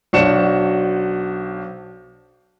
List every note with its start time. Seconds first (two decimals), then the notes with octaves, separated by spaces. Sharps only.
0.13 B1 D4 F#4 C5 C#7 E7